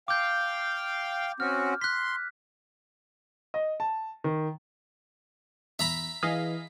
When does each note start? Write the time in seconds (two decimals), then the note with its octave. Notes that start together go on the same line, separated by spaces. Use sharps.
0.08 F5 G5 D6 G6
1.40 C4 C#4 F#4 F6
1.81 C6 F#6 B6
3.54 D#5
3.80 A5
4.24 D#3
5.79 E2 E5 A#5 B5
6.23 E3 G#4 D#5 F5 B6